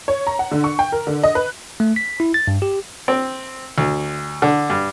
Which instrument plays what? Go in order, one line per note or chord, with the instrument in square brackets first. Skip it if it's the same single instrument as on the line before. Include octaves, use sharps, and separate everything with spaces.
[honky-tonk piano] C#5
A#5
F#5
D3
C#6
G5
A#4
D3
D#5
B4
[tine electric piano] A3
B6
E4
A6
G2
G4
[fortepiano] C4
D2
D3
G2